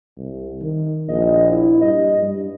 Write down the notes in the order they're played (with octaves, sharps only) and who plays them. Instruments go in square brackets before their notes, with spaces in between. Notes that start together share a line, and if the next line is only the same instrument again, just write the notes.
[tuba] C2
D#3
[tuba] A#1 [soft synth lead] D#5
[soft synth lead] E4
[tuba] G2 [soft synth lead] D#5
[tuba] G2